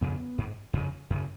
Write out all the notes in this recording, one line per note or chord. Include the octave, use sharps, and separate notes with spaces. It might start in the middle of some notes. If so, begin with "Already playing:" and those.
F2 C#3 B3
G#2
F2 C#3
F#2 C#3